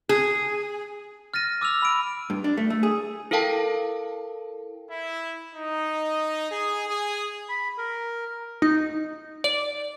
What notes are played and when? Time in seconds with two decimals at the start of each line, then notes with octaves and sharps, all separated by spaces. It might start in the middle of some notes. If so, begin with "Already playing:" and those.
0.09 G#4
1.34 F6 A6 A#6 D#7
1.61 D6 E6 F6 F7
1.82 B5 D7
2.30 G2
2.44 D4
2.57 A3
2.70 A3
2.83 G#4
3.31 E4 A4 A#4 F5 G5 A5
4.91 E4
5.56 D#4
6.51 G#4
6.88 G#4
7.49 B5
7.78 A#4
8.62 D#4
9.44 D5